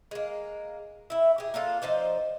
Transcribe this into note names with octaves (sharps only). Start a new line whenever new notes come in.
G#3 A#3
E4 E5
G4 G#4
A#3 D4 F4 A4
F3 D#4 C5 D5